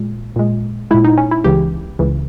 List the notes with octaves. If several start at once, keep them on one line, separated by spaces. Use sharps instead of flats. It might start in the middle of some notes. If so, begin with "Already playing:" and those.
Already playing: A#2 G#3
A#2 G#3
A#2 G#3 E4
D#4
C#4
E4
C#2 C#3 E3 G4
C#2 C#3 E3